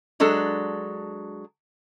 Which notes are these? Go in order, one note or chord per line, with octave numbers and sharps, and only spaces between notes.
F#3 G#3 D4 A4